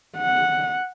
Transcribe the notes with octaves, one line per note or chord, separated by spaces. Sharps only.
F#5